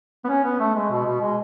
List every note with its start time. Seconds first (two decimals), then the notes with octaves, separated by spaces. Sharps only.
0.25 B3
0.29 C#4
0.44 B3
0.60 A3
0.75 G#3
0.91 B2
1.06 B2
1.21 G#3